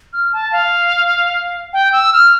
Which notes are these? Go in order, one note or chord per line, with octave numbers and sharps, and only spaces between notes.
F6
A5
F5
G5
E6
F6